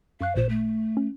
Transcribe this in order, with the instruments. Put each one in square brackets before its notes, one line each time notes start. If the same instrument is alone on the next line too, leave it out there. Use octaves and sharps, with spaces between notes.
[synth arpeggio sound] F#2 C#6 F#6 [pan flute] F5
[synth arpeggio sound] A1 A#2 E7 [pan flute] C5
[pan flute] A3
[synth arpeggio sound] C#4